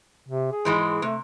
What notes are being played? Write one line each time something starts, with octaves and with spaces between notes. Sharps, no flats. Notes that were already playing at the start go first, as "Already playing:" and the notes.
C3
G#4
G#2 E3 G#3
C3 A3